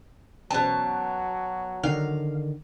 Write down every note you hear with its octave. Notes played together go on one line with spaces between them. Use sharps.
B2 E3 F#3 C#4 C5 A5
D3 D#3 F5